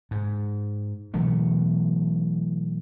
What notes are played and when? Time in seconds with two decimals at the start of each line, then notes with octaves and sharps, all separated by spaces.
0.11 G#2
1.14 B2 E3 F#3 A3